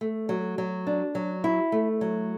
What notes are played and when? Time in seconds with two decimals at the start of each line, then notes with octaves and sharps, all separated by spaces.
0.01 A3
0.29 F#3
0.58 F#3
0.87 D4
1.15 F#3
1.44 E4
1.72 A3
2.01 F#3